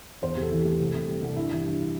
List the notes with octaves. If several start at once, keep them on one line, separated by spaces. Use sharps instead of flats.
E2 C5
C3
A4
E3
A3 G4
C2
C3
G3
C2
G2 E4
E3 E4
G3 D4
E4